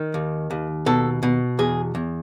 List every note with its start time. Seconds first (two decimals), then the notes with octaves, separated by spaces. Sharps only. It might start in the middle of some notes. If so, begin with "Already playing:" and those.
Already playing: D#3
0.14 D#2
0.51 D#2
0.86 B2 A4
1.23 B2
1.59 E2 G#4
1.95 E2